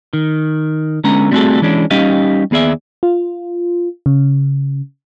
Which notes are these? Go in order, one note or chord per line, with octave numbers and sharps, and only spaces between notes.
D#3
D3 G#3 B3 C#4 A#5
G3 A3 C4 F#4 G#4 A4
E3 G#3 C#4 D4
G3 C#4 D#4 G4 D#5 F5
D#2 B3 G#4 D5 E5
F4
C#3